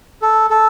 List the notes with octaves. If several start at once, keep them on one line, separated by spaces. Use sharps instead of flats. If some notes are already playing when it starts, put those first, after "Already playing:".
A4
A4